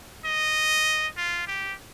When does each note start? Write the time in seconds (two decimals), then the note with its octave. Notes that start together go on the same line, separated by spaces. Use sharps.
0.26 D#5
1.17 F4
1.47 G4